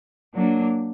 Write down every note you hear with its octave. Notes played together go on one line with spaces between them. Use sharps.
F#3 A#3 D4